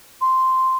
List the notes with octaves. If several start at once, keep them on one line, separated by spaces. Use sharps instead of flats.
C6